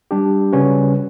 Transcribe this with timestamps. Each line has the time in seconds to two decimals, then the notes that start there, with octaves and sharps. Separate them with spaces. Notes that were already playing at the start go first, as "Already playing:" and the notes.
0.11 G3 D4 G4
0.52 C#3 G3 C#4 F#4 B4